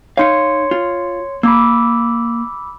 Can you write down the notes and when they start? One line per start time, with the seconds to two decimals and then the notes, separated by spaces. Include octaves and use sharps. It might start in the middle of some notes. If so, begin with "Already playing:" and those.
0.17 D#4 C#5 F5 C6 C#7
0.71 F4
1.43 A#3 B5 D6 E6